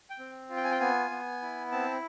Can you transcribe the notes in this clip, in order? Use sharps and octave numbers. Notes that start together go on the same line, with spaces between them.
G5
C4
F4
G5
G#5
G5
B3 G#5
B3
E4
C4 A5